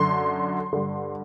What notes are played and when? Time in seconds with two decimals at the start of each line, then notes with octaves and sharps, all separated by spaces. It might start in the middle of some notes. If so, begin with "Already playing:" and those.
Already playing: F#2 D3 C6
0.73 G2 D3